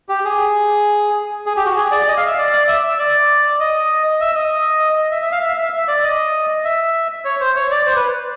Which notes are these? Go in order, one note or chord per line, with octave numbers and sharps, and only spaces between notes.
G4
G#4
G#4
G4
F#4
G#4
D5
D#5
F5
E5
D5
D5
E5
E5
D5
D#5
E5
D#5
E5
E5
F5
E5
E5
E5
D5
D#5
E5
C#5
C5
C#5
D5
C5
B4